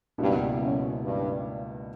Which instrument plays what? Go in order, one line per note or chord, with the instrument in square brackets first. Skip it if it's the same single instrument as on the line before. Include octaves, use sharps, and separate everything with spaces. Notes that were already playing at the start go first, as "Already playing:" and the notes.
[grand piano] C#2 B2 A#3 E4 [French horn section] G2
[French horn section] F#2
G2